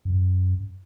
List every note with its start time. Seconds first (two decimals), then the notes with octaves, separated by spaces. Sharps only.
0.05 F#2